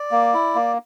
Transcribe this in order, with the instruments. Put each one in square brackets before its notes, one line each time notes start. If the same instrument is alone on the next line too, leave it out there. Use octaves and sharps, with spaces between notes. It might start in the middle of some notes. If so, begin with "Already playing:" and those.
Already playing: [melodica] D5
A#3
E4
A#3